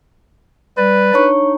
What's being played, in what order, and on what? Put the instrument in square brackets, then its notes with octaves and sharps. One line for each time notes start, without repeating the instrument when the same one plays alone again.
[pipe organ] G3 D5 [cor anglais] B4
[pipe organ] D4 D#4 [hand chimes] C#5 C#6